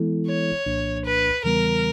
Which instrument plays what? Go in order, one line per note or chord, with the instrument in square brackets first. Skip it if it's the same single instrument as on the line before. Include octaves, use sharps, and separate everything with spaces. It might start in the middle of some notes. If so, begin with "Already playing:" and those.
Already playing: [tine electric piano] E3 G#3 B3 E4 A4
[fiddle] C#5
[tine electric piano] C2 A#2 F3 A#3 D4
[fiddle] B4
[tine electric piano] E2 C#3 E3 G3 B3 [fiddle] A#4